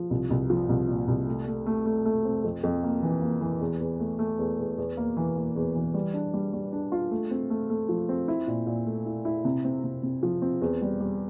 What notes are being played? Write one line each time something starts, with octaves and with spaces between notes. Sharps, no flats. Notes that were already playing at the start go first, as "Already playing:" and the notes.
Already playing: F3
C2
C2
F3
C2
A#2
C2
A3
A3
A3
A3
A3
C4
F2
F2
A#3
E3
A#3
E3
E2
E2
A3
A3
E2
E2
E2
A#3
E3
A#3
E2
E3
G3
D4
G3
G3
D4
F4
A3
C4
A3
A3
F3
C4
E4
A#2
A#2
A3
E4
E4
C3
C4
C3
C3
F3
C4
E2
G3
G3